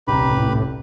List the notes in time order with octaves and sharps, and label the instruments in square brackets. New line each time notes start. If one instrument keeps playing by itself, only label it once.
[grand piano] D#1 C2 A#5 [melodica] G4 B4 B5
[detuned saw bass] A2